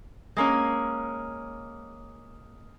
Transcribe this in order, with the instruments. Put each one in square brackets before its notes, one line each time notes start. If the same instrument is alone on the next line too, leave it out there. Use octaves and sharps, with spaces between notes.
[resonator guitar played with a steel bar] G#3 A#3 C#4